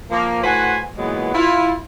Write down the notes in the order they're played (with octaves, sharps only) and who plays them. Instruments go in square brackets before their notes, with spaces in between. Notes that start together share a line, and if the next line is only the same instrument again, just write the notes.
[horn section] F3 A#3
A2 F#4 B4 C5 F#5 G#5
A#2 E3 F#3 G#3 B3
E4 F4